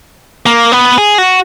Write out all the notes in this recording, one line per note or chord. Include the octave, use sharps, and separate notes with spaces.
A#3
B3
G#4
F#4